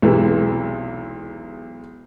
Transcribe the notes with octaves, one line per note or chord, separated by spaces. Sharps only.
B1 E2 C3 E3 G#3